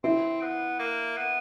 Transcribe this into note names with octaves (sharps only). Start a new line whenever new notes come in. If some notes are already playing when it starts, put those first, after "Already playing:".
C4 E4
B3
A#3
B3